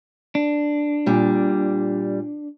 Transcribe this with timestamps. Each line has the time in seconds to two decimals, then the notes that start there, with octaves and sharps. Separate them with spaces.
0.35 D4
1.06 A#2 G3